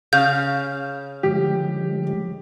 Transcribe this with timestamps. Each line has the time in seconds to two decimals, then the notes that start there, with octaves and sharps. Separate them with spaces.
0.13 C#3 F5 G6
1.23 D3 F3 G#3 G4